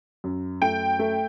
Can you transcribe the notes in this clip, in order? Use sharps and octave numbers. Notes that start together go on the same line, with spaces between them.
F#2
A3 G5
A3